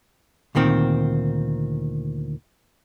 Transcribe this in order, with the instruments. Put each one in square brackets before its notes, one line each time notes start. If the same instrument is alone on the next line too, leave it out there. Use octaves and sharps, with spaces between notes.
[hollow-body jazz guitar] D2 A#2 D#3 C4